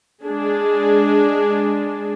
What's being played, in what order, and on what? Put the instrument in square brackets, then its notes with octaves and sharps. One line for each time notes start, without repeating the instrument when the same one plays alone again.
[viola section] G#3 D4 G#4